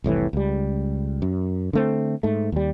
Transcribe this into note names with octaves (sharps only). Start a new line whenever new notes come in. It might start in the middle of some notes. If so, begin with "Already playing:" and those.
F1 C2 A2 E3
C#2 G3
F#2
D3 A3 C4
G#2 A3
D#2 G3